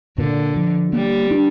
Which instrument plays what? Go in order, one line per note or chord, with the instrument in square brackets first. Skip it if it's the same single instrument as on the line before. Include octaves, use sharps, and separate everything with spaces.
[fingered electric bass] A#2 [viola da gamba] D3
[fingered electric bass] F3
[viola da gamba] G3 [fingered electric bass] A#3
[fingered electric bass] D4